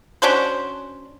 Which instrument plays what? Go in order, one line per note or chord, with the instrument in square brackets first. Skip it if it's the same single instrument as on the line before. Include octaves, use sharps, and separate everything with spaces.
[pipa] C#4 D4 F#4 C5